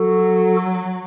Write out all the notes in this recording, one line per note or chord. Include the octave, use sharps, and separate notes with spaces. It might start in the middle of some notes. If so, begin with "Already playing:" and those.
Already playing: F#3 F#4 A4